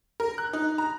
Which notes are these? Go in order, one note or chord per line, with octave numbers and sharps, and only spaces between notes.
A#4
F#6
D#4
A#5